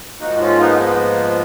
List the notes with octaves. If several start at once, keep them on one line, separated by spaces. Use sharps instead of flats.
G#2 F3 A#3 D#4 F#4
C#4 F4
B3 D#4
B3